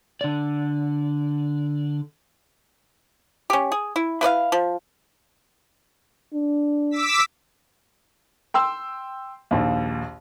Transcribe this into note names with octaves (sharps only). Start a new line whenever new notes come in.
D3 D5
C#4 G4
G#4
E4
E4 B4 D5 F5
F3
D4
D6 E6 B6
G5 C6 E6
A#1 D#2